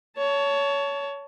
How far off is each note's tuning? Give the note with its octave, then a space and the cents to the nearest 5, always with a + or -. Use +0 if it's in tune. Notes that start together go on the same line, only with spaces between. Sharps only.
C#5 +20 A5 +0